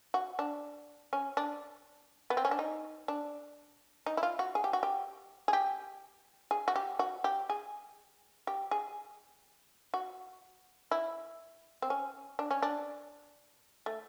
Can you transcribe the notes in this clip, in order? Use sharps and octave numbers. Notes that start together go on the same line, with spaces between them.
F#4
D4
C#4
D4
B3
C4
C#4
D4
D#4
D4
D#4
E4
F4
F#4
G#4
G4
F#4
G4
G#4
G4
G#4
F#4
G4
F#4
G4
G#4
G4
G#4
F#4
E4
C4
C#4
D4
C#4
D4
A3